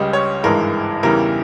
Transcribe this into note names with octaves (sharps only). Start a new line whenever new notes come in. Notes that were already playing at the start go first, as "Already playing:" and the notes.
Already playing: C#2 C#3 G3 D#5
C#5
G#1 G2 E3 G#3 A#4
E2 C#3 E3 G3 A#4